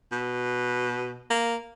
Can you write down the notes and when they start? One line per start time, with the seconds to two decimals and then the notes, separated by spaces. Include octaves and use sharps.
0.12 B2
1.30 A#3